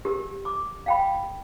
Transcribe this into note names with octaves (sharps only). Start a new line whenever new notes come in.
G4 A#4
D6
F5 G5 B5